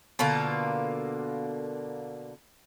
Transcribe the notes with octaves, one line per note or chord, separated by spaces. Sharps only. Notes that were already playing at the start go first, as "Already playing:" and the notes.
B2 D3 A#3 F4